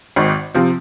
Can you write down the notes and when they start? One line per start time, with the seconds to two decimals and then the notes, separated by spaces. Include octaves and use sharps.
0.16 G#1 G#2 D#3
0.54 C3 F3 C4